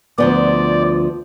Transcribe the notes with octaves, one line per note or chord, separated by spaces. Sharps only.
D2 F3 B3 D5